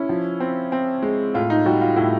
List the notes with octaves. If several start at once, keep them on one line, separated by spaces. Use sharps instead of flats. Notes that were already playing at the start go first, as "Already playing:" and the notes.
Already playing: C#4 E4
F3
C4
C4
G#3
A2 F4
D#4
G3 F#4
F4
A2 E4